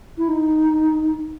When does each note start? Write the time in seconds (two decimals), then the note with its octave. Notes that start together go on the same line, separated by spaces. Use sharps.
0.18 E4
0.28 D#4